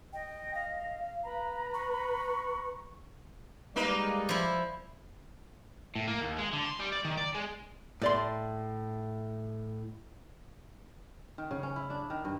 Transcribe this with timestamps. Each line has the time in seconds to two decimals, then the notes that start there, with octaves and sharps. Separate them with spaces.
0.13 D#5 G5
0.54 F5
1.24 B4 A#5 B5
1.74 C#6
3.76 G3 G#3 A#3 D#4 B4 D5
4.29 F3 E4
5.95 A2
6.07 A#3
6.21 D#2
6.38 G#3
6.53 D3
6.66 C6
6.80 G3
6.93 D5
7.05 D#3
7.17 D5
7.35 G#3
8.02 A2 D5 C6
11.38 D#3
11.51 C#3
11.63 C#4
11.76 E4
11.90 D4
12.10 D#3
12.25 G2